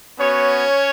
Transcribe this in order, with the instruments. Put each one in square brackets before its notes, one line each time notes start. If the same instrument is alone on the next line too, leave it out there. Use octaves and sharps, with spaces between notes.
[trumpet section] B3 C#4 F#4 C#5